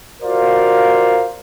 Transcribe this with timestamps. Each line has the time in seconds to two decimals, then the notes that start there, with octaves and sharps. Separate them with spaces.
0.23 F4 F#4 A#4 C5 D5 F5